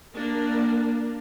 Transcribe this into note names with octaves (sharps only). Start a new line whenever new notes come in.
A#3 D4 A#4